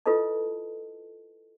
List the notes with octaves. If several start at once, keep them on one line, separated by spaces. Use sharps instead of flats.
E4 F4 A4 B4 D#5 A5